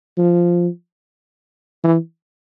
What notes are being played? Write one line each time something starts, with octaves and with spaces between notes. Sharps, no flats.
F3
E3